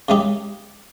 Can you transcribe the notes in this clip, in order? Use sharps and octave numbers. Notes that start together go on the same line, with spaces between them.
C#3 G#3 D#4 G4